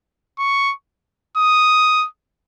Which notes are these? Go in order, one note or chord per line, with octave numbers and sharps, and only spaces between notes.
C#6
D#6